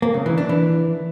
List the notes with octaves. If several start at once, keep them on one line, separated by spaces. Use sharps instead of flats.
A#3
C#3
E3
D4
E3